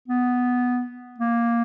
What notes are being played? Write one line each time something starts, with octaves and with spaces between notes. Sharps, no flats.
B3
A#3